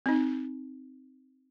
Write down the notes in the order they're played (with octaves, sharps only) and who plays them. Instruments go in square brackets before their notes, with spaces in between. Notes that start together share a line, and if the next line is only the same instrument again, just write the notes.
[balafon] C4 D#4